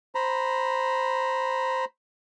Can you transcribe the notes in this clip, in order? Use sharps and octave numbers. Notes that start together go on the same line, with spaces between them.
C5 A#5 B5